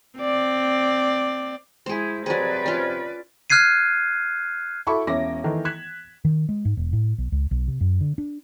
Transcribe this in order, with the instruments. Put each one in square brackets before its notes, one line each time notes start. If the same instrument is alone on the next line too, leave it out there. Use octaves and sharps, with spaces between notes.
[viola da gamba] C4 D5
[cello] G#3 E4 [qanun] G#4 C5
[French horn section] C3 C5 [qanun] F#3 G#4 [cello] B4 D5
[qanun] C#4 F4
[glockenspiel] F6 F#6 G#6 C7 D#7
[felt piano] E4 F#4 A4 B5 C#6 D6
E1 C#4 E5 D6 A#6
D#3 E3 A3
F#6 G#6 B6 E7
[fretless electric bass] D#3
G#3
G#2
E1
A2
B1
C#2
B1
C3
F#2
D3
D4